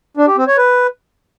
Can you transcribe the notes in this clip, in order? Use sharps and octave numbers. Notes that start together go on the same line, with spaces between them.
D4
G4
C4
C#5
B4